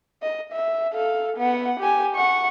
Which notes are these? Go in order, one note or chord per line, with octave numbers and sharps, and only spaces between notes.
D#5
E5
A4 F5
B3 F#5
G4 G#5
F#5 C#6